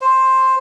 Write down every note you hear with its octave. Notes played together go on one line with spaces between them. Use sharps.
C5